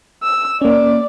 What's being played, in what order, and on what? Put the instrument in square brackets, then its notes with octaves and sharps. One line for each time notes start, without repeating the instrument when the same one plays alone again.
[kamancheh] E6
[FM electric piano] A#3 C#4 [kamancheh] D5